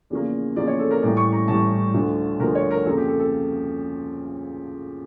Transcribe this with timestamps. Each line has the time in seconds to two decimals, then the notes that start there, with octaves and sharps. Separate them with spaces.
0.10 E2 C#3 F3 A#3
0.56 E2 C#3 F3 A#3 D5
0.67 C#5
0.79 A4
0.91 A#4
1.02 A1 A2 E3 G3 D5
1.17 C#6
1.32 A#5
1.48 A1 A2 E3 G3 A5
1.94 D2 D3 F3
2.39 D2 D3 F3 A#4
2.55 C#5
2.71 A#4
2.85 F2 C#3 F3 A#3 A4
2.97 G4
3.08 A4
3.20 A4